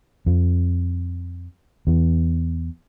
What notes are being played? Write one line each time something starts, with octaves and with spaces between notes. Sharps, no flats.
F2
E2